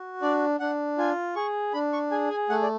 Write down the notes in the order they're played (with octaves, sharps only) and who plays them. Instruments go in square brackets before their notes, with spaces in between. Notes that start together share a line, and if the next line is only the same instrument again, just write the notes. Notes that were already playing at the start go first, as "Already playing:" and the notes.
Already playing: [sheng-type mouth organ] F#4
D4 D5
D4 F#5
F4 G#5
G#4 C#6
D4 B5
C#6
G#4 G#5
G#5
A3 F#5
D5